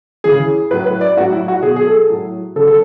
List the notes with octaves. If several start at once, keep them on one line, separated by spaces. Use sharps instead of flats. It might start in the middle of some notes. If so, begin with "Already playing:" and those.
C#3 E3 G#4
A2 F#3 B4
B4
D5
A2 F#3 F#4
E4
F#4
B2 F#3 G#4
G#4
A4
A2 F#3
C#3 F#3 A4
A4